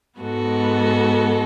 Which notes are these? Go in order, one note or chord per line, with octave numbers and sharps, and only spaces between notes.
G#2 G#3 B3 F#4 A4